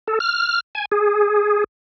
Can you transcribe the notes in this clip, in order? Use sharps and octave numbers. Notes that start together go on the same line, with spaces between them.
A4
F6
G#5
G#4